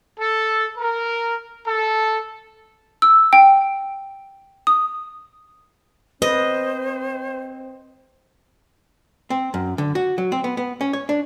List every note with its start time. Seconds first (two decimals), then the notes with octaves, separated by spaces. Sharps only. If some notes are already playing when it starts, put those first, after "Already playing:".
0.18 A4
0.77 A#4
1.65 A4
3.02 E6
3.33 G5
4.67 D#6
6.22 C4 B4 C5 D#5
9.30 C4
9.54 F#2
9.78 D3
9.95 F#4
10.18 F#3
10.32 C4
10.44 B3
10.57 B3
10.81 C#4
10.93 C#5
11.09 D4